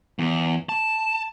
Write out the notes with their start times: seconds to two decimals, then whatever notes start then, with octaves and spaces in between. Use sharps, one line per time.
0.19 E2
0.69 A5